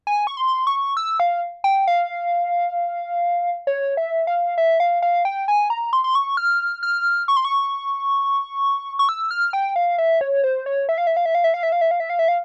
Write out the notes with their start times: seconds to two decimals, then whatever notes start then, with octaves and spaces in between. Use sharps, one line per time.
0.07 G#5
0.27 C#6
0.37 C6
0.67 C#6
0.97 E6
1.20 F5
1.64 G5
1.87 F5
3.67 C#5
3.97 E5
4.27 F5
4.58 E5
4.80 F5
5.02 F5
5.25 G5
5.48 G#5
5.70 A#5
5.93 C6
6.04 C6
6.15 C#6
6.37 F6
6.83 F6
7.28 C#6
7.37 C6
7.45 C#6
8.99 C#6
9.09 E6
9.31 F6
9.53 G5
9.76 F5
9.98 E5
10.21 C#5
10.44 C5
10.66 C#5
10.89 E5
10.98 F5
11.07 E5
11.17 F5
11.26 E5
11.35 F5
11.44 E5
11.54 F5
11.63 E5
11.72 F5
11.81 E5
11.91 F5
12.00 E5
12.10 F5
12.19 E5
12.28 F5